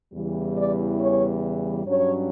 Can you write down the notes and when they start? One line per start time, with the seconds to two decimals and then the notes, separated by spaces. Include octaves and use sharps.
0.13 E2 C#3 E3 G3
0.57 D5
1.00 C#5
1.86 G2 F#3 C#4 C#5